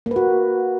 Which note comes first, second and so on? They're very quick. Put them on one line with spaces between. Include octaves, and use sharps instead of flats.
A#3 B4 F#4